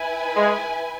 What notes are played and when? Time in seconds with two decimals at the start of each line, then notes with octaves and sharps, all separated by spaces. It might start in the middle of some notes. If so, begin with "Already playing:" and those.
Already playing: E4 B4 G#5
0.36 G#3